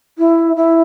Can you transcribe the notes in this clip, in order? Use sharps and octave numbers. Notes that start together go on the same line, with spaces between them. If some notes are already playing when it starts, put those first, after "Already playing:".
E4
E4